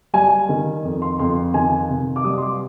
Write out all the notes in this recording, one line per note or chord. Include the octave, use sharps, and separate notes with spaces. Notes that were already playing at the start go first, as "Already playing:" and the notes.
G3 G#5
D#3
F2
C6
F2 C6
D#3 G#5
C3
D6
G3 D#6
C6
D6